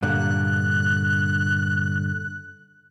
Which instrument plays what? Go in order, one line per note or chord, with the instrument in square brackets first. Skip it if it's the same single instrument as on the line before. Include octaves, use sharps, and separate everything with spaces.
[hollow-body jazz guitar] G2 A#2 D3 [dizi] F#6